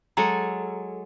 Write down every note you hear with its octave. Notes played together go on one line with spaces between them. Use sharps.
F#3 G#3 A4 A#5